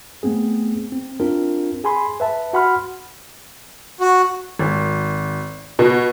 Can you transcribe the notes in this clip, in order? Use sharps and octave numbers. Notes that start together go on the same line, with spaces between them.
A3 B3 C4 G#4
C4
C4 D4 F4 A#4
G#4 G#5 B5 C6
B4 E5 A5
F#4 F#5 B5 C6 F6
F#4
G#1
B2